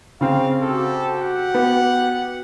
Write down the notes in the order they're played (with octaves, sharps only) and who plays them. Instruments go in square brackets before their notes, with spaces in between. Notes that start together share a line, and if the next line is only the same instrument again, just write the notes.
[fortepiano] C#3 C4 [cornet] F5
[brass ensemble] F#4 G4 [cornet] A4
[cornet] F#5
[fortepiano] B3